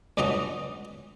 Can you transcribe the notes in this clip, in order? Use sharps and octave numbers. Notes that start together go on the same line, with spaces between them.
C#2 G2 F#3 F#4 D#5 A#5